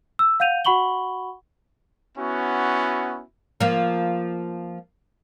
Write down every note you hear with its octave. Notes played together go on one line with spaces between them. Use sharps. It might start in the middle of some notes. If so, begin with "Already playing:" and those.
E6
F5 F#5 G6 D#7 F7
F#4 F#5 B5 C#6 F#7 G7
B3 C#4 E4 F#4
F3 A#3